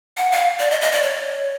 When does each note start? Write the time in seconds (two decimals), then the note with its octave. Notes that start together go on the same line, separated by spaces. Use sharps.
0.17 F#5
0.32 F5
0.59 D5
0.71 D#5
0.81 D#5
0.92 D5
1.02 C#5